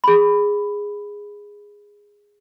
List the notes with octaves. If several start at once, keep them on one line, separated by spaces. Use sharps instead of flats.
G#4 B5